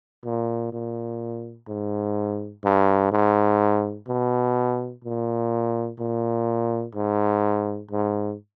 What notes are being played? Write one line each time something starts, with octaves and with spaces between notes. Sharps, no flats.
A#2
A#2
G#2
G2
G#2
B2
A#2
A#2
G#2
G#2